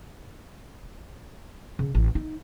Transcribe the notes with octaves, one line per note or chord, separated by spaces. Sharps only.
C#3
A1
D#4